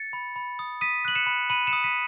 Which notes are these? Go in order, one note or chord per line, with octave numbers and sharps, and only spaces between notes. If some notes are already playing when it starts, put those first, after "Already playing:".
Already playing: A6 C#7
B5
B5
D#6
D#6 B6 D#7
F#6 F#7
C#7 E7
B5
B5 D#7 F#7
C#7 E7
D#6
B6 D#7